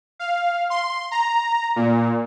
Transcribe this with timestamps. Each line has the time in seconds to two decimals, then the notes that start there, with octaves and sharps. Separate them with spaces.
0.19 F5
0.70 C6
1.11 A#5
1.76 A#2